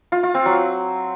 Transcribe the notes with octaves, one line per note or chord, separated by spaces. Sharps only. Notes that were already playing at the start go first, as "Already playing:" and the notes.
F4
F4
C4
F#3